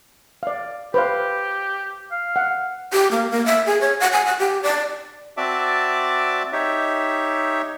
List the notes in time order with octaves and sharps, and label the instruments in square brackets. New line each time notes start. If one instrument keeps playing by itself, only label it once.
[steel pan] D5 F5
[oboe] G4 [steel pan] B4 C5 F5
[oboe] F5
[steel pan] F#5
[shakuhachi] G4
A#3
A#3
E5
G#4
C#5
F#5
G#5
F#5
G4
D5
[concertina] C4 F#4 D5 E5 A5 D6
D#4 G4 C#5 E5